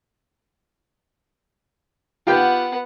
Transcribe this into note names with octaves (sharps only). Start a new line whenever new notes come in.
B3 F4 G4 F#5 G5